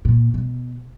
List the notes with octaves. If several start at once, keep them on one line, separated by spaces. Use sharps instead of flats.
A#2
B2